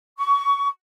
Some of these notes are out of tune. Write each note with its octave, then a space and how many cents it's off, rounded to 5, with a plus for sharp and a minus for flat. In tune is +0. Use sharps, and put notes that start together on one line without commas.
C#6 +25